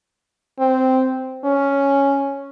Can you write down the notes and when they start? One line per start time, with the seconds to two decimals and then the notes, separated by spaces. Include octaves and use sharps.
0.59 C4
1.44 C#4